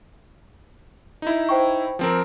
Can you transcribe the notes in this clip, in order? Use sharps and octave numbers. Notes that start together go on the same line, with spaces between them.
D#4 E4
C5 G5 C#6
F3 C4 A#4